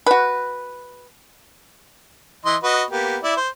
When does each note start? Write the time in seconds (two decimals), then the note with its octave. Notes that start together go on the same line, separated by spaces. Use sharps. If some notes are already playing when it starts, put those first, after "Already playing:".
0.06 F#4 B4
2.45 E3 D#5 C6
2.63 F#4 B4 D#5
2.91 A#3 B3 G4
3.23 E4 D5
3.37 C5